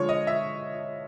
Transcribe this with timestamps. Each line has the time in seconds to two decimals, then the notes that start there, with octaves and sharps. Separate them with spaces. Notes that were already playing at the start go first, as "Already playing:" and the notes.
Already playing: D3 F3 G#3 C#5
0.09 D#5
0.27 E5